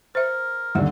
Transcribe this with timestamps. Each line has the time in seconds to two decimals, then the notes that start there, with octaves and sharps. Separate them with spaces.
0.15 A#4 C5 E5
0.75 D#2 D3 G3 E5 F#5